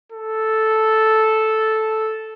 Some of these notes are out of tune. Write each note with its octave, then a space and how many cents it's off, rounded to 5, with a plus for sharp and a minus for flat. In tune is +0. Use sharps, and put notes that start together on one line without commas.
A4 -5